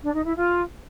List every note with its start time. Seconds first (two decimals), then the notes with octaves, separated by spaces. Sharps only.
0.03 D4
0.14 D#4
0.26 E4
0.37 F4